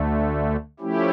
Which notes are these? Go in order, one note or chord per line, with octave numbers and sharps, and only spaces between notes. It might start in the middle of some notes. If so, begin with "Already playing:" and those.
Already playing: D2 D3 A3
F3 A3 C#4 E4 G4